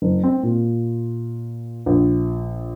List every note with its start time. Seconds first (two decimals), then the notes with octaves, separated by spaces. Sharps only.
0.02 F#1
0.24 C4
0.43 A#2
1.86 A#1